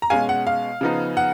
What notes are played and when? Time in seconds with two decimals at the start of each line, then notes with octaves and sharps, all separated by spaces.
0.02 A#5
0.10 B2 G#3 C#4 F5 G#5
0.29 F#5
0.47 F5
0.81 C#3 F3 B3 D#4
1.17 F#5